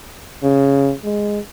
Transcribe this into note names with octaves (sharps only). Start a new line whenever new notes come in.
C#3
G#3